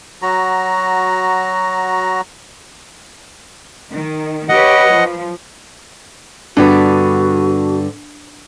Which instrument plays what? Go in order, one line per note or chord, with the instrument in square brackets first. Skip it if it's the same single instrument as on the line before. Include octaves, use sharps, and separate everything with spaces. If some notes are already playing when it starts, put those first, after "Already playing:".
[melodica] F#3 F#4 A#5
[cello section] D#3
[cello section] G4 B4 C#5 [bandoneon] D#5 F#5
[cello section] F3
[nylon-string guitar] G2 D3 B3 [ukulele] D4 [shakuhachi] F#4